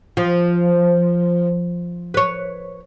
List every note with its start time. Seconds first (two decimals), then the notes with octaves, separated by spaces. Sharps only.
0.17 F3
2.14 B4 C#5